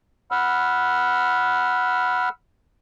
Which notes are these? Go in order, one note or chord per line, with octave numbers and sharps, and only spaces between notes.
F#5 B5 E6 F6